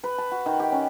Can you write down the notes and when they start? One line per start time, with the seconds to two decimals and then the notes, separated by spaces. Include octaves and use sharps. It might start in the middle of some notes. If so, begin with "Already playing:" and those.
0.04 B4
0.18 A5
0.32 F#4
0.46 D#3
0.60 G4
0.72 C#4